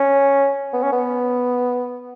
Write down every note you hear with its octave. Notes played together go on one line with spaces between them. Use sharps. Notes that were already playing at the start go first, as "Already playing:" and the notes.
Already playing: C#4
B3
C#4
B3